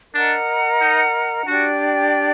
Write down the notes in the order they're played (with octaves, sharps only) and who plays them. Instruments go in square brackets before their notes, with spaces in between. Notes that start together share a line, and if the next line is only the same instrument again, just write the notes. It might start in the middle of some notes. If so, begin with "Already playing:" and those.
[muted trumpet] D4 [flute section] A#4 D#5 F#5 A#5
[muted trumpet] D#4
[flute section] D4 G4 D5 G5 [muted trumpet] F#4